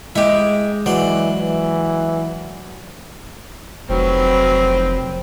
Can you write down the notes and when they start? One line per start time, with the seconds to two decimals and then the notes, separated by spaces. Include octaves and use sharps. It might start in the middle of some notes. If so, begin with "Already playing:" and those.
0.16 G#3 E4 G4
0.86 E3 F#3 C5 D5
1.38 E3
3.90 F1 F#3 C4 A#4 B4